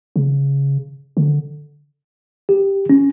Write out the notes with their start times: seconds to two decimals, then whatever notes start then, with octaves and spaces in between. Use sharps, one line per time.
0.16 C#3
1.17 D3
2.49 G4
2.90 C#4